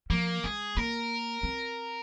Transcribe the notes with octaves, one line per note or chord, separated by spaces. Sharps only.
F3 A#3
G#3 G#4
A#3 A#4
C4